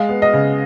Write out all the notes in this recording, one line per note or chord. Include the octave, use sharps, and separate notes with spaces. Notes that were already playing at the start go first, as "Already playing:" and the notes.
Already playing: G#3 F5
B3
D#5
C#3